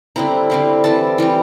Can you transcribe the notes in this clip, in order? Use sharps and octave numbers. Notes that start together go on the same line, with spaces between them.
D3 G3 C4 E4 A#5
D3 G3 C4 E4
E3 G3 C4 A5
E3 G3 C4